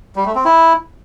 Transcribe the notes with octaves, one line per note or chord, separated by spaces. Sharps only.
G3
A3
C4
E4